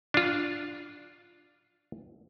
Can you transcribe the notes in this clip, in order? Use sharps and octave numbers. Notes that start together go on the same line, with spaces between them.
D4 F4